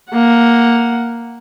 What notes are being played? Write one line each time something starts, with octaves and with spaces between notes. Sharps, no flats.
A#3 F#5